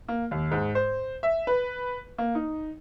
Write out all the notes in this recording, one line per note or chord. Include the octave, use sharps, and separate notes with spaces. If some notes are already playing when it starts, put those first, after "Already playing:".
A#3
D#2
G#2
C5
E5
B4
A#3
D#4